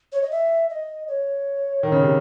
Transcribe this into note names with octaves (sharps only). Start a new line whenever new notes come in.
C#5
D#5
E5
D#5
C#5
D#3
C#3
C3